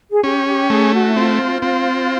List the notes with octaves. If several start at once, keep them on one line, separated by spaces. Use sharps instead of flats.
G#4
C#4 G4
G4
A3 G#4
F#4
E4
C4 F4
C4